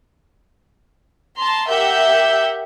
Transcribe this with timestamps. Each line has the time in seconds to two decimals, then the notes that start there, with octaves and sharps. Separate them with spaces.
1.38 A5 A#5 C6
1.68 G4 A#4 E5 F#5 G6